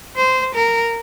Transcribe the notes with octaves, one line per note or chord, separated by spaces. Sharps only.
C5
A#4